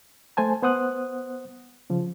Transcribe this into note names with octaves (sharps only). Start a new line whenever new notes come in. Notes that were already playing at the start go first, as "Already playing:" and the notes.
A3 C5 G#5 A5
B3 C5 F#5 D#6 F#6
C#3 F3